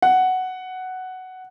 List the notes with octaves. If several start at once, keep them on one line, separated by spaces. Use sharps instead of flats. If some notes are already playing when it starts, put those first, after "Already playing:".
F#5